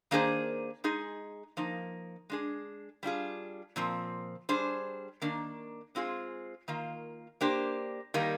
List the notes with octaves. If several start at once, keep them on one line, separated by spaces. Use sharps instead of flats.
D#3 A#3 D4 G#4 C5
G#3 D#4 G#4
F3 A#3 D#4
G#3 D4 G#4
G3 D4 F4 G#4
A#2 F3 C4
G3 D4 G#4 C5
D#3 A#3 D4
G#3 C4 F4 G#4
D#3 A#3 F4
A#3 D4 G4 C5
D#3 G3 A#3 D#4